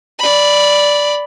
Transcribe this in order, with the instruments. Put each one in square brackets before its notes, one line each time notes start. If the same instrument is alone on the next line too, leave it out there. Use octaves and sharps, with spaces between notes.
[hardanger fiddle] D5 B5